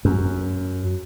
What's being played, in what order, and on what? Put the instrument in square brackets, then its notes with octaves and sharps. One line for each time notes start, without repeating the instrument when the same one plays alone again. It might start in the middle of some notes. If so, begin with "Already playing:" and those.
[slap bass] F#2